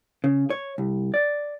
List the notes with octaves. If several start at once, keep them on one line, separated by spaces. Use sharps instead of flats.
C#3
C#5
C2
D5